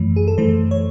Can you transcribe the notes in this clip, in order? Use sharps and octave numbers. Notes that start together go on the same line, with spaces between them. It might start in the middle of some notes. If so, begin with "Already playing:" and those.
Already playing: F#2 E3 A3
G#4
A4
F#2 E3 A3 C5
C#5